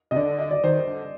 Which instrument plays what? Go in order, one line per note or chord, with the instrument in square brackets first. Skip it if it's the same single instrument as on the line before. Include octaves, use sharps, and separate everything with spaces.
[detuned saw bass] C3 [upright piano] D#5
[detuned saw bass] D3 [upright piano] D5
[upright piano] D#5
D5
[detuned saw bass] D#3 [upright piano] C5
[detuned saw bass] D3